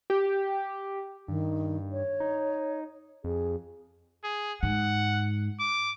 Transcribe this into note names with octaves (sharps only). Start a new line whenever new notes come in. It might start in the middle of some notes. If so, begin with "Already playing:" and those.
G4
G2 D#3
C#5
D#4
F2 G#4
G#4
G#2 F#5
D6